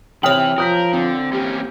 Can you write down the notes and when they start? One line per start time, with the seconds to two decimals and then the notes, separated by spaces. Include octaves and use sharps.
0.23 C3 E3 C#5 G5 D#6 F6 F#7
0.58 F3 A#4 D#6 G6 B6
0.93 D3 C4
1.33 E3 A#3 C#4 G4